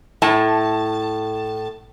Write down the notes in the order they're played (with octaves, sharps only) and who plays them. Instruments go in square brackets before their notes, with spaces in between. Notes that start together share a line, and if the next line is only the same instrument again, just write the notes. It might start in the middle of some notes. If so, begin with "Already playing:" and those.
[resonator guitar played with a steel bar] A2 A5